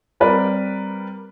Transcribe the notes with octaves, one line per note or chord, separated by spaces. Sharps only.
G3 C4 A#4 B4 D5